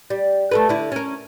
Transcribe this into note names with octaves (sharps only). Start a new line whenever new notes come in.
G3
A3 A4 B4
D3 E4
C#4 A#4